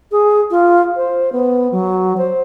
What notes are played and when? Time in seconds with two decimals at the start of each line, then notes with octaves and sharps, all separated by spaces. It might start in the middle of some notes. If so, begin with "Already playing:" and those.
0.12 G#4
0.51 F4
0.96 C5
1.33 B3
1.72 F#3
2.18 C5